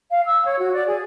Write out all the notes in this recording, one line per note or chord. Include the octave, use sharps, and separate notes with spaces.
F5
E6
C#5
F#4
D5
G#4